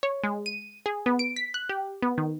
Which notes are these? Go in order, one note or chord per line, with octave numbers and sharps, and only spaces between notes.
C#5
G#3
D#7
G#4
B3
D7
B6
F#6
G4
B3
D#3